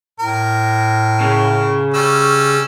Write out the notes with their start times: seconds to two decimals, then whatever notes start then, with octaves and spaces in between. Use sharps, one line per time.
0.20 A2 A#4
1.21 C#3
1.94 G3 C#4 E6